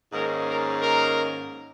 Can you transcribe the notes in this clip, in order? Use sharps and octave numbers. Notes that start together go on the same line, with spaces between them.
G#2 D#3 A#3 C#4 A#4
A#4
A#4